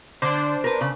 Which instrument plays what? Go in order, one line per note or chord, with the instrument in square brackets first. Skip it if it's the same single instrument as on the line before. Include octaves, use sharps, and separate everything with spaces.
[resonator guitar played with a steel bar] D3 [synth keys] D4 C5
[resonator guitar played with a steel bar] A#4 B4
C#3